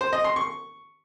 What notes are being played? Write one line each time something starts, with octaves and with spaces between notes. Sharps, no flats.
C5
D#5
C6
C#6